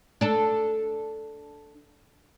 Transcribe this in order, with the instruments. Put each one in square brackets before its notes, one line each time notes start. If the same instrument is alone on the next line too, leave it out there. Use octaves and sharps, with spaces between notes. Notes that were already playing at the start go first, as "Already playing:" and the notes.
[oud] D4 A4